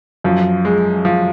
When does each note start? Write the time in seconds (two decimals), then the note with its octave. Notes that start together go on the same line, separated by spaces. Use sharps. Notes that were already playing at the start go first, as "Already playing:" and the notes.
0.24 F#2 F3
0.65 G#3
1.05 F3